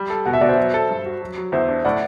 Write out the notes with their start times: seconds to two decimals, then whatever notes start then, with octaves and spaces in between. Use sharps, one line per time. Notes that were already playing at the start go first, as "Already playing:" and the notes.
Already playing: G3
0.10 A4
0.25 B2 F#5
0.33 E5
0.41 B2 D5
0.49 C5 E5
0.57 F#3
0.74 A4
0.89 G2
1.06 F#4
1.22 F#3
1.38 F#3
1.52 E2 C5 E5
1.69 D4
1.85 A2 D5 F#5